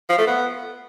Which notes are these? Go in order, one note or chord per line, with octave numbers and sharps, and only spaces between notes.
F3
A3
B3